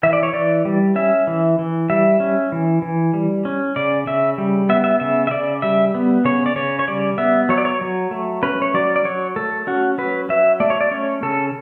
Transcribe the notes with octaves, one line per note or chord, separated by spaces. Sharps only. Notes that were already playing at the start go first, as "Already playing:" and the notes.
E3 E5
D5
C#5
E3 D5
G3
C#4 E5
E3
E3
G3 E5
C#4
E3
E3
G3
C#4
C#3 D5
C#3 E5
G3
B3 E5
E5
C#3 E5
E5
C#3 D5
G3 E5
B3
C#3 C#5
D5
C#3 C#5
C#5
G3 D5
B3 E5
F#3 C#5
D5
C#5
F#3
A3
C#4 B4
C#5
F#3 D5
D5
F#3 C#5
A3 A4
C#4 F#4
F#3 B4
F#3 E5
A3 D5
C#5
D5
C#4 C#5
C#3 A4